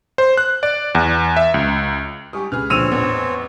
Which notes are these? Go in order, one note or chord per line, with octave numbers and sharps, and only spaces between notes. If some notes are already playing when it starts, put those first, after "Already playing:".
C5
F#6
D5
E2
E5
C#2
G3 G4 G#5 C#6 D#6
C#2 G#4 B4 F6
D2 A#2 F3 C4 C#5 E6 D#7 F7
A1 E2 B3 B4